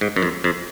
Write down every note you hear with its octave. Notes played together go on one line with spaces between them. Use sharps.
G#2
F#2
F2
F2